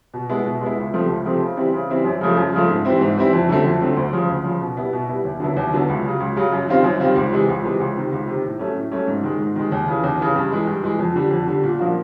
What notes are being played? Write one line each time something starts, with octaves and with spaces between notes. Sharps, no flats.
B2
G#3 B3 E4
B2
G#3 B3 E4
C#2
C3 F3 A3 C4
C#2
C3 F3 A3 C4
C#3
E3 G3 C4 E4
C#3
E3 G3 C4 E4
F#2
C#3 F3 A3
F#2
C#3 F3 A3
G#2
E3 G3 C4 E4
G#2
E3 G3 C4 E4
F2
D3 F#3 A3 C4
F2
D3 F#3 A3 C4
D2
C#3 F3
D2
C#3 F3
B2
G3 B3 E4
B2
G3 B3 E4
D#2
D3 F#3 B3 E4
D#2
D3 F#3 B3 E4
C#2
C#3 F#3
C#2
C#3 F#3
F#2
D#3 G3 C4 F4
F#2
D#3 G3 C4 F4
C#2
C3 E3 G#3
C#2
C3 E3 G#3
C#2
C3 D#3
C#2
C3 D#3
A2
F#3 A3 C#4
A2
F#3 A3 C#4
G#2
D#3 G#3
G#2
D#3 G#3
D#2
C#3 E3
D#2
C#3 E3
G2
E3 G#3
G2
E3 G#3
F2
D3 G3
F2
D3 G3
A#2
F3 A#3 D4 F#4